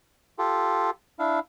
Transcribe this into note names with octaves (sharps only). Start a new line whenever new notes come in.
F4 G4 A4
D4 E4 F5